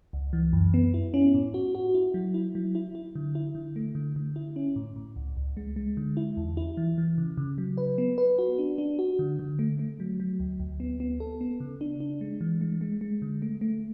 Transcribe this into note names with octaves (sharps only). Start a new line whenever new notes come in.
C#2
E3
F#2
B3
E4
C#4
A2
F#4
F#4
E4
F#3
E4
F#3
E4
E4
D3
E4
D3
A3
D3
D3
E4
C#4
A2
A2
C#2
C#2
G#3
G#3
D3
E4
E2
E4
E3
E3
C#3
C#3
F#3
B4
B3
B4
F#4
D4
D4
F#4
D3
D3
A3
A3
F#3
F#3
D2
D2
B3
B3
A4
B3
C#3
D4
D4
G#3
E3
G#3
G#3
G#3
D3
A3
A3